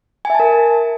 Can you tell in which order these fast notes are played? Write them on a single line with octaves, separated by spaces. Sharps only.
G#5 E5 A5 A#4